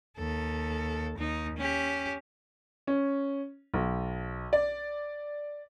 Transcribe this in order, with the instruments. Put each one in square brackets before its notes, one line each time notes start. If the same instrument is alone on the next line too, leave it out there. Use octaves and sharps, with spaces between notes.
[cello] D#2 A4
D#2 D#4
C#4 G4
[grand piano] C#4
B1
D5